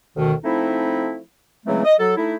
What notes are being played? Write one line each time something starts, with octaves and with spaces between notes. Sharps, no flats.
D2 B2 D#3
F3 A3 C4 D#4 E4
C#3 E3 F#3 G#3 A3 C4
D#5
F#3 A4
A3 D#4 E4